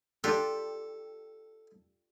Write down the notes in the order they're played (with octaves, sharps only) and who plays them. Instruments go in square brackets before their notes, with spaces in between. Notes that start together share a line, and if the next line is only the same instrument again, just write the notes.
[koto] D4 F4 G4 [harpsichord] A4